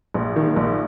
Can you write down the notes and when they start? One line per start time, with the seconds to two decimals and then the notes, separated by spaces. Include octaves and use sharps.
0.14 A#1
0.36 D#3
0.56 A#1